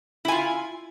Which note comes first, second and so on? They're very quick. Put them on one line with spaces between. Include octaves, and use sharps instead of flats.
E4 G#5 F4